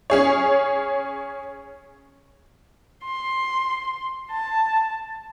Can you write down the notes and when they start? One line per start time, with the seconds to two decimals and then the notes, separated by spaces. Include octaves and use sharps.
0.10 C#4 G#4 C#5
3.04 C6
4.30 A5